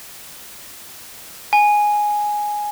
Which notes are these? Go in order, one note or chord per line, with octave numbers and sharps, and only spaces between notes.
G#5